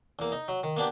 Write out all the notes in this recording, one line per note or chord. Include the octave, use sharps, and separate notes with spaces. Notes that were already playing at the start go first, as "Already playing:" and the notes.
E2 A#3
D#4
F#3
D#3
A#3 B3 D4 G4